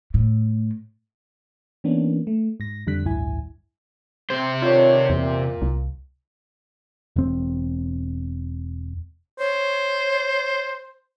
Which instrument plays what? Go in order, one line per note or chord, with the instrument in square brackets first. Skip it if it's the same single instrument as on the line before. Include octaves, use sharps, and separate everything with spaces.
[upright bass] A2
[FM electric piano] E3 A#3 B3 C#4 D4
A3
G#2 A#6
F2 D3 G3 F#6 B6
A1 D2 G2 E4 G#5
[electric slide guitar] C3 C5
[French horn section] D3 D#3 C#5 [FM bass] F4
[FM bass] E2 [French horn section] A#2
[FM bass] C2
[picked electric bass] E1 C4
[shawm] C5 [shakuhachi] C#5